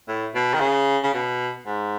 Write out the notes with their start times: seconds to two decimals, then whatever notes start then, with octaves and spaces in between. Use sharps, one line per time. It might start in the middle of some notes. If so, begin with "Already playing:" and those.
0.08 A2
0.35 B2
0.54 D#3
0.60 C#3
1.04 C#3
1.14 B2
1.66 G#2